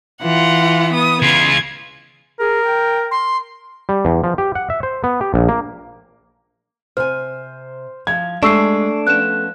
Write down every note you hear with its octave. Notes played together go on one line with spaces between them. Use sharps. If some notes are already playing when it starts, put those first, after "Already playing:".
E3 F4 F#5
B3 D#6
C#3 F4 G#6
G#4 A#4
G5
C6
G3
E2
F3
G4
F#5
E5
C5
B3
G4
A#1
A#3
C3 C5 G#5 F6
F3 G#6
G#3 A3 D4 G4 G#4 C#6 E6 C7
F3 B3 C#4 F#6 E7